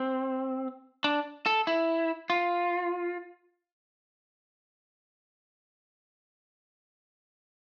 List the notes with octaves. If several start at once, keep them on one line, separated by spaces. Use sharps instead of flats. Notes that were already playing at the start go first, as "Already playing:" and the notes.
Already playing: C4
D4
A4
E4
F4